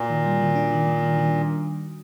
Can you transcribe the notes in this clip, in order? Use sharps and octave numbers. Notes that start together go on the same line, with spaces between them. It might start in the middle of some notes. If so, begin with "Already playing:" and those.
Already playing: A#2 F#4
D#3
G3
D#3
D4
D#3
D#3
D#3
D#3